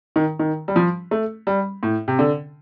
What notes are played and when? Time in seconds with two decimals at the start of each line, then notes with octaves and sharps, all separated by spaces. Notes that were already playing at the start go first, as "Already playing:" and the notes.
0.16 D#3
0.39 D#3
0.68 G3
0.76 F3
1.11 A3
1.47 G3
1.83 A2
2.08 C3
2.19 D3